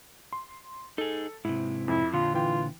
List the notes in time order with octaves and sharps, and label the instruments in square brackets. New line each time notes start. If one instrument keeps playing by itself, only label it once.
[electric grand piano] C6
[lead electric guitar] D#4 G#4 [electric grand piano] A4
[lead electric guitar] G#2 C3 [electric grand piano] E4
[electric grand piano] F2 [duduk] E4
[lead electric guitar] A#2 D3 [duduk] F4
[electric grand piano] E3 G5 [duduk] F4